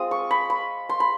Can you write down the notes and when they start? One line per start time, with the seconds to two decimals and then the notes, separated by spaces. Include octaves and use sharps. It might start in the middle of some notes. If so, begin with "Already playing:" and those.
Already playing: G#3 C4 F4 D#6
0.11 C#6
0.31 B5
0.50 B5
0.89 C6
1.00 B5